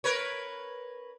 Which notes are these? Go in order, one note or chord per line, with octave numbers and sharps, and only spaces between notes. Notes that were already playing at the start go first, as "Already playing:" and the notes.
A#4 B4 C#5